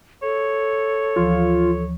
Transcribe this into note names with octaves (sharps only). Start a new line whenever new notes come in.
A4 C#5
D2 E3 F3 F4